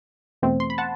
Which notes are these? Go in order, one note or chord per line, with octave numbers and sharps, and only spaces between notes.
E2 B2 A3 C4
C6
B5
F#5 A5